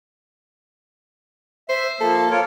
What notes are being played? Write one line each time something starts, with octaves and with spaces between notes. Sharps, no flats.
C5 E5
F3 A#3 A4
F4 A#4 C#5